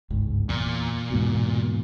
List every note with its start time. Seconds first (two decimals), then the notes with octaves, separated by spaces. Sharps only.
0.10 G1 C#2 G#2
0.49 E2 A#2
1.10 E2 G#2 B2